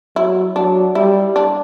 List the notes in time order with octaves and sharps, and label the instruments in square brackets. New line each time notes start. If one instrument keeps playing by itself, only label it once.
[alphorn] F#3 [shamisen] E4
[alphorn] F#3 [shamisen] D4
[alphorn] G3 [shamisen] E4
[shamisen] D4